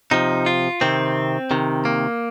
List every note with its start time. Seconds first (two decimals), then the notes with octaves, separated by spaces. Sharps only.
0.11 C3 F3 D#4
0.46 F4
0.81 C3 D#3 C4
1.51 C3 D#3
1.85 A#3